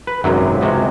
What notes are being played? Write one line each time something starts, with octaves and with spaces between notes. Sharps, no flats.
B4
G#1 F#2 C3 F#3
C#2 C3 G#3 F#4